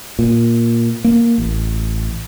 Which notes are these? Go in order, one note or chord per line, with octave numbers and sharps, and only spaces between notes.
A#2
A#3
A1